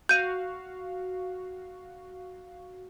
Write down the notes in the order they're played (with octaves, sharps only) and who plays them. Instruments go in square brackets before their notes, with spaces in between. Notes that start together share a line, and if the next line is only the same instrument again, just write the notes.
[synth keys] F#4 F5 [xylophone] G6 D#7